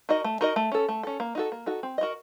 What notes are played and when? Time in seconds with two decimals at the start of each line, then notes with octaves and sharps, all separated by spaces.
0.09 D#4 F#4 A#4 D#5
0.24 A3
0.41 D#4 F#4 A#4 D#5
0.56 A3
0.72 C#4 A4
0.88 A3
1.03 C#4 A4
1.20 A#3
1.35 D#4 F#4 A4
1.52 A#3
1.66 D#4 F#4 A4
1.83 C4
1.98 F#4 A#4 D#5